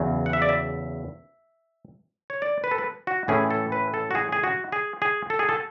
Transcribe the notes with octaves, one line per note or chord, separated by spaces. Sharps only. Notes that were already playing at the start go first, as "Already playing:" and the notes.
Already playing: E2 C#3 F#3
F#5
E5
D5
E5
C#5
D5
B4
A4
B4
F#4
A2 E3 A3 C#4 E4 G#4
A4
B4
A4
F#4
G#4
G#4
F#4
G#4
G#4
A4
G#4
A4